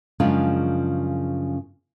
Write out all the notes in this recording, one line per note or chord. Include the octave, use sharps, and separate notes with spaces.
F#2 C#3 F3 G#3 D4 F4